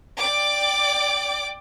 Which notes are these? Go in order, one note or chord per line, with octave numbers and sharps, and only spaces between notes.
D5 G5 D6